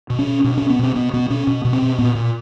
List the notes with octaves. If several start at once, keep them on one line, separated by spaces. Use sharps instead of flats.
B2
C#4
B2
B2 D4
C#4
B2
B3
B2 C4
B2 B3
B2 B3
B2 C#4
B2
B2
C4
B2
A#2 B3
A#2